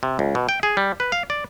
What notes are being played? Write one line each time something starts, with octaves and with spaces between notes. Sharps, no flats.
C3
C#2
B2
G5
G#4
G3
B4
F5
D5